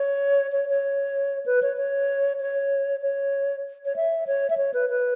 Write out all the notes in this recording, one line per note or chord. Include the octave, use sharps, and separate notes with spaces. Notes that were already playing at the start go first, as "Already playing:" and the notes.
Already playing: C#5
C#5
C#5
B4
C#5
C#5
C#5
C#5
C#5
E5
C#5
E5
C#5
B4
B4